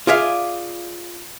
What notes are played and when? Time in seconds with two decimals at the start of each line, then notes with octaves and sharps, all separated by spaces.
0.07 F4 G#4 D5 E5 F5